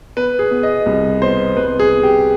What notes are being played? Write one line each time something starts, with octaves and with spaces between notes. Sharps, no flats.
B3 B4
G#4
B3
D#5
C2
B3 C5
C2 B4
G#4
B3
G4